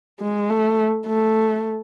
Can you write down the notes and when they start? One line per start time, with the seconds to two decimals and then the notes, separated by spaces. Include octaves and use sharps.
0.20 G#3
0.50 A3
1.07 A3